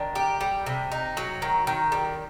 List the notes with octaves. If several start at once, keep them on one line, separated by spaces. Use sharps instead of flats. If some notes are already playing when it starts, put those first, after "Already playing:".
Already playing: D#3 D4
G4
G3
C3
D#4
F#3
D#3
D#3
G3